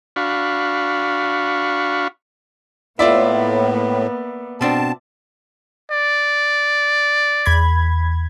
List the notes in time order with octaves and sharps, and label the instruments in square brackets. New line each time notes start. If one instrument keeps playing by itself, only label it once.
[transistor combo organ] D4 F#4 F5 B5 C#6
[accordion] A2 [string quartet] A#3 B3 [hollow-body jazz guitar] E4 F4 [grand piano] D5 E5
[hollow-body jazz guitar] B2 C4 D4 [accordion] A5
[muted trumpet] D5
[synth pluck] E2 B5 G#6